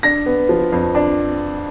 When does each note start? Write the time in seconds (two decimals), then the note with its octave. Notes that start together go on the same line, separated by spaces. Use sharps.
0.03 D4 A#6
0.26 B3
0.49 F3
0.72 F2
0.95 D4